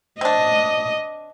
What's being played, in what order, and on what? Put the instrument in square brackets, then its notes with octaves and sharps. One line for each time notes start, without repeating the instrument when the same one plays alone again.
[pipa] C4 D4 [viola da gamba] D#5